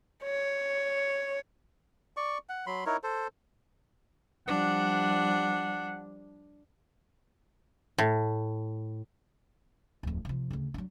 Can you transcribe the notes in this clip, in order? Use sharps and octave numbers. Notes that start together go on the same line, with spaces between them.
C#5
D5 C#6
F#5
F#3 B5 C6
D#4 E4 A#4 C#5
A4 C5
F3 G3 D4 F#5
A2
D1 F2
C3 F3
D2 C#3
F#3 D4